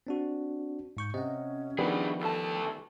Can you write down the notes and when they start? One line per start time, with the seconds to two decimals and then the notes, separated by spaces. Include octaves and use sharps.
0.07 C4 D4 F#4
0.97 G#2 C#6 G6
1.14 C3 C#4 D#5 F#5
1.78 D#3 F3 G3 B3 D4 G#4
2.21 D2 A4 A5